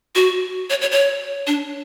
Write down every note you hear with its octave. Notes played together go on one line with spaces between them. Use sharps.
F#4
C#5
C#5
C#5
D4